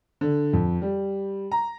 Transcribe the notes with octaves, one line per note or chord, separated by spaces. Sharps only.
D3
F2
G3
A#5